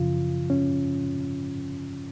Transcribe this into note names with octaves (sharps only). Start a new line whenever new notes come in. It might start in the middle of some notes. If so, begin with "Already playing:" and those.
Already playing: F#2 C#3 F3 F4
C#4